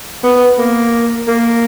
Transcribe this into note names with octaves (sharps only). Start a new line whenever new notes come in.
B3
A#3
A#3